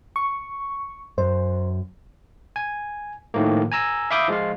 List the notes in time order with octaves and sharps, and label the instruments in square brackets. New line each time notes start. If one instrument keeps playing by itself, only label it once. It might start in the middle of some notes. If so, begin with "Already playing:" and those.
[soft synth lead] C#6
[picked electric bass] F#2 [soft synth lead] C5
[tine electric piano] G#5
A2 D#3 F3 A3 A#3
G#5 A#5 E6
E5 F5 B5 D6 D#6 G6
F3 G#3 F4 F5